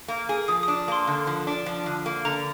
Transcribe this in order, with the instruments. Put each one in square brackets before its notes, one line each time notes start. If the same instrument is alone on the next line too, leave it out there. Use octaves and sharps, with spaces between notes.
[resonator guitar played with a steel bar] A#3
G#4
[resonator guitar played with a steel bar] F3 [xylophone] D#6
[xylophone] D#6
[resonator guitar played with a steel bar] D4
[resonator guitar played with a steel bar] A#3 [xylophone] C6
[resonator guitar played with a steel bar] D3
F3
D4
F3
D3
A#3
[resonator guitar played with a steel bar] D3 [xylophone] A#5